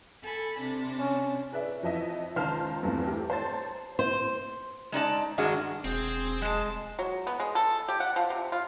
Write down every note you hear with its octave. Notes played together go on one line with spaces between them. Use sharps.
A4 G#5 B5
C3 D4
C#4
G#4 B4 D5 E5
F2 E3 F3 D#5 E5
C#2 D#3 C5 A5 F6
E2 G2 F3 A3 B3 C4
A3 G4 A#4
C5 C#5 A5 A#5 A6
C5
G#3 D#4 D5 A5
G2 D#3 G#3 D4 F#4
E1 C4 G#4
G#3 E4 A5
F#3
B3
G#3
A4
G4
F#5
F3
C3
F4